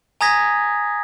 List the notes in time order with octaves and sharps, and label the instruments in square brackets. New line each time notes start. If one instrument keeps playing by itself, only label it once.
[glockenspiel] G#5 A#5 D#6 G#6 A#6 B6